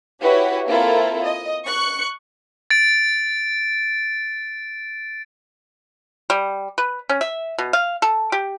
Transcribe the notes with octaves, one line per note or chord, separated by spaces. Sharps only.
E4 F#4 G4 B4 C#5
A#3 C4 E4 F4 A4 A#4
D#5
C#6 F#6 C#7
A6 D7
G3
B4
C#4
E5
B2
F5
A4
G4